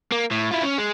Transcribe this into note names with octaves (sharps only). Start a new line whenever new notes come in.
A#3
A2
E4 F4
C#4
G#3